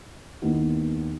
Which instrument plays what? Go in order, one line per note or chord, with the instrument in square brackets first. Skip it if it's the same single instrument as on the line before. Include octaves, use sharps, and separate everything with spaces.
[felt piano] D#2 D#3 B3 E4 G4